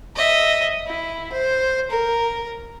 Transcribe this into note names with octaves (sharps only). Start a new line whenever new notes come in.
D#5 E5
E4
C5
A#4